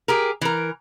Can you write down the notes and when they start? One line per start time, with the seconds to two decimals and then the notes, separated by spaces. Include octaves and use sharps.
0.08 G4 G#4 A#4
0.41 E3 A#4